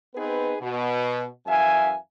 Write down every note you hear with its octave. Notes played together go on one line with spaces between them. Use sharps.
B3 C4 D#4 G#4 B4
B2
F#2 E3 E5 F5 G#5